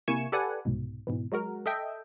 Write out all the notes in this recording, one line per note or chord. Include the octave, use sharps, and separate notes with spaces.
C3 A#3 E4 G#5 C#6 E7
G4 A4 B4 D5 F#5 G#5
C2 G#2 B2
G#2 B2 E3
F#3 G#3 F#4 A#4
A4 D#5 E5 G5